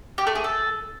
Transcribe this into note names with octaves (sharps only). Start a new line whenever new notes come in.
G4
A3
G#4
A4